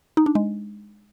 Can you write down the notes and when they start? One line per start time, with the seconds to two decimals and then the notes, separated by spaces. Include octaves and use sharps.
0.17 D#4
0.26 D4
0.35 G#3